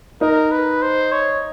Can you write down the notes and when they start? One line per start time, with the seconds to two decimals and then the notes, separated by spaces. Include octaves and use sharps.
0.21 D#4 A#4
0.52 B4
0.82 C5
1.12 C#5